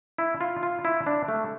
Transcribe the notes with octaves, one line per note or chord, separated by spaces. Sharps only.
E4
F4
F4
E4
D4
A3